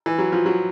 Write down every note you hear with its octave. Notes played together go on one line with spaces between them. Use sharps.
E3
F#3
F3
F#3